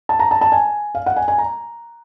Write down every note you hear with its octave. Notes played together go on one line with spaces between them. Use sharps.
A5
A#5
A5
A5
G#5
F5
F#5
G#5
G#5
A#5